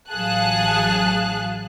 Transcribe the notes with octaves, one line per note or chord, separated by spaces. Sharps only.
A1 F#3 G#4 F5 A5 F#6